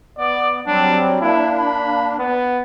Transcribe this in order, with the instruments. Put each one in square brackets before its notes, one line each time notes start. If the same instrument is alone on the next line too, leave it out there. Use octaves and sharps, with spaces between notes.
[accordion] B3 [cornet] D5
[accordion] F#3 G3 C4 [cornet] D4
[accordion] A#3 D4 [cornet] E4
[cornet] B5
B3